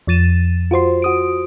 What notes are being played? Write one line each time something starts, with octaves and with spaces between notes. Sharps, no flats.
F2 F3 A6 D#7 E7
F4 F#4 C5 C6
F#4 D#6 D7